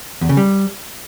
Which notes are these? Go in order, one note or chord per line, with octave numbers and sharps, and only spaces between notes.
E2
C#3
G3